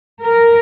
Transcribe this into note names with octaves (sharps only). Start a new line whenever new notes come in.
A#4